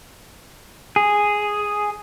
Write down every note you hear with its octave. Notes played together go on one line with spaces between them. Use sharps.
G#4